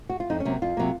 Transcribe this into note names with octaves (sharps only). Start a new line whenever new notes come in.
F#4
F4
F2 D#4
C#4
C3 F#3 A#3
F2 F4
C3 F#3 A#3